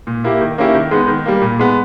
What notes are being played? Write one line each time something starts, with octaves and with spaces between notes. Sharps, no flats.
A#2
A#3 E4 G4
D#3
A#3 C#4 E4 G4
D#3
G#3 B3 D#4
D#3
G3 A#3
A#2
G#3 B3